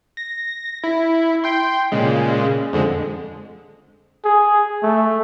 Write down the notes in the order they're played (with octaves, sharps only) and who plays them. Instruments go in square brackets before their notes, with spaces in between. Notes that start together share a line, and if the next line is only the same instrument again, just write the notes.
[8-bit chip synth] A#6
E4
G5 C6
A#2 C#3 G#3
F2 D3 G#3
[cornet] G#4
A3